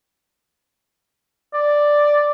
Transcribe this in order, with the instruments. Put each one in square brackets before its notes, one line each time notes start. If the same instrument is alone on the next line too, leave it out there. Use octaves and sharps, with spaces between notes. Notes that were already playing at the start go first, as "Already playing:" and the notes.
[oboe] D5